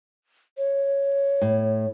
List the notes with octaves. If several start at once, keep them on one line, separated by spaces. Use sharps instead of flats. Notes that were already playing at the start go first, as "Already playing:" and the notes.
C#5
A2